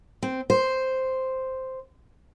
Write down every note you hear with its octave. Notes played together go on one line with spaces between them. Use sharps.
C4
C5